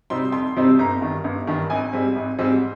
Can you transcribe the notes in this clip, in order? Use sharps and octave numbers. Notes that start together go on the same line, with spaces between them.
C3 G3 C4 D#4 C6
F2 C6
C3 G3 C4 D#4
G1 A#5
G2 D#3
G1
G2 D#3
G#1 G#5
G#2 G3 C4
G#1
G#2 G3 C4